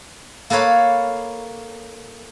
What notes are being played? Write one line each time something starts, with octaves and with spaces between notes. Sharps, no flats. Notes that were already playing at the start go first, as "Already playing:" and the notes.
A#3 A4 B4 C#5 F5